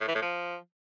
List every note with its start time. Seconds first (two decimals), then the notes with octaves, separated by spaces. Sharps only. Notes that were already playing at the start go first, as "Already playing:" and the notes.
0.01 A2
0.08 E3
0.15 A2
0.22 F3